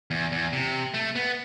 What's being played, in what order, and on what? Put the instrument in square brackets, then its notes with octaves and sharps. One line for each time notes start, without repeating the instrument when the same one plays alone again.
[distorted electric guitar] E2
E2
C3
A3
B3